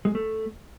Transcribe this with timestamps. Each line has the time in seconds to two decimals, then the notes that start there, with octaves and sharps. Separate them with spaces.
0.05 G#3
0.15 A3